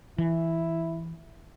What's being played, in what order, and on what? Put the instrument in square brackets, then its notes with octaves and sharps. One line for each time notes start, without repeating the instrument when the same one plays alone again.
[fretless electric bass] E3 [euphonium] E4